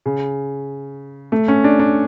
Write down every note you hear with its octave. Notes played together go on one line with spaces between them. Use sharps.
C#3
A3
C#4
D4
D4